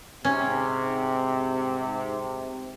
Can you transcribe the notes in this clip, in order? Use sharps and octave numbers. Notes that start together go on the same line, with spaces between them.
G#2 C3 C#4